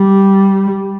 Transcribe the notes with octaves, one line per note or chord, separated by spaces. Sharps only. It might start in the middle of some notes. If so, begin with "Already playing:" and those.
Already playing: G3